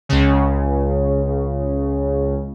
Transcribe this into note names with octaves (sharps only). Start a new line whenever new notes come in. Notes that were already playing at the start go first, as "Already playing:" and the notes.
C#2 C#3